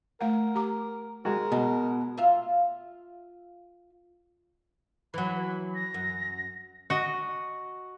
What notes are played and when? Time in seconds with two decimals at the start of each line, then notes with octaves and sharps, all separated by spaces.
0.21 A3 A#4 F5 F#5
0.55 G4 A#5 D6
1.25 G#3 F#4 A#4
1.52 B2 D#5 A#5
2.18 F4 E5 F5
5.14 E3 F#3 B5
5.75 A#6
5.94 F#2
6.90 F#4 D#5